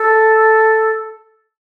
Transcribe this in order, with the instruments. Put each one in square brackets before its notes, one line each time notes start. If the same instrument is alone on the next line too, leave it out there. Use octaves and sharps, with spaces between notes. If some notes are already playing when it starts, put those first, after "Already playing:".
Already playing: [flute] A4